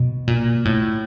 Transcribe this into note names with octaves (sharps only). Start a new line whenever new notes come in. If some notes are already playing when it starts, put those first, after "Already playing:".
Already playing: B2
A#2
A2